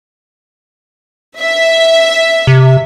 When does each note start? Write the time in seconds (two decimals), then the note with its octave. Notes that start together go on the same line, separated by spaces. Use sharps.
1.40 E5
2.47 C3